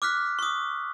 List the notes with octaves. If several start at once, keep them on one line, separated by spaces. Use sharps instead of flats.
D6 F6 F#6 B6
C#6 D#6